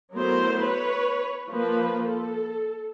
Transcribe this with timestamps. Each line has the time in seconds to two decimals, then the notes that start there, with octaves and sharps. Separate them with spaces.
0.14 F#3 A3 B3 E4 A#4 C5
0.64 B4 C#5
1.49 F3 A#3 B4
2.07 A4